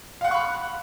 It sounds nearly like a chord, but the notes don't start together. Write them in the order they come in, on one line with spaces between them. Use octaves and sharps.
F5 F#5 F#6 C#6 B5